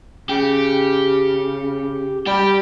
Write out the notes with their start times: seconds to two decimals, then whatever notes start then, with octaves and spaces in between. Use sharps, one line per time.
0.30 C#3 G4
2.27 G3 G4